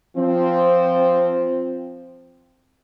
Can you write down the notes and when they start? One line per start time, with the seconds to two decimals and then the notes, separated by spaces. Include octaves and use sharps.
0.17 F3 C4